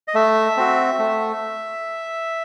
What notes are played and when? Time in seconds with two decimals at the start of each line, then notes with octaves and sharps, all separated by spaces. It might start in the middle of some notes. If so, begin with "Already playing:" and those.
0.08 D#5
0.14 A3 E5
0.57 C4 F#4
0.99 A3